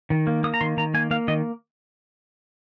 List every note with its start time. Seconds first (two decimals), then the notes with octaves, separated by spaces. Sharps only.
0.10 D#3
0.27 A#3
0.44 A#3 D#6
0.54 A#5
0.61 D#3 C6
0.77 D#3 A#5
0.94 A#3 G#5
1.11 A#3 F5
1.28 D#3 D#5